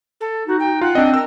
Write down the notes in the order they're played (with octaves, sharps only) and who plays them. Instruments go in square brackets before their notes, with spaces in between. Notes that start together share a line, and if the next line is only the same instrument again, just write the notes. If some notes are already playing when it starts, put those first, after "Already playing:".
[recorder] A4
[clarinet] D#4 [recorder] F#4
[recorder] G5
[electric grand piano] F4 [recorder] F#5
[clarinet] C4 [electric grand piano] D4 D#5
[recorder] A#4 [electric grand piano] E6